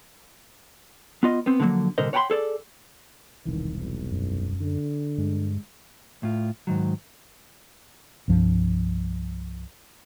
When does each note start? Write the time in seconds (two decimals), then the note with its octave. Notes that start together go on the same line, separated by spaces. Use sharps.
1.23 B3 F4 D#5
1.46 B3 C4
1.60 D3 F3 F#3 A3 A#3
1.98 C2 A#2 D3 A#4 C5 D#5
2.13 C#5 F#5 G5 A5 B5 C6
2.30 G#4 A4 C#5 D5
3.46 E1 C2 D#3 E3
3.80 B1
4.11 F#2
4.61 D3
5.18 G2 G#3
6.23 A2 F4
6.67 G#2 D#3 F#3
8.28 C2 G2 F3